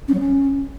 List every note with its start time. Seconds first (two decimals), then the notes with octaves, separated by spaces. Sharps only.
0.08 C#4
0.13 F#3
0.19 C#4